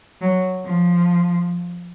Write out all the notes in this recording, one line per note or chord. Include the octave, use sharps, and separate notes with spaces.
F#3
F3